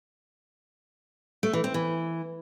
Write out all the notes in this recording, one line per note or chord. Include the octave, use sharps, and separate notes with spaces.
A3
E3
C4
E3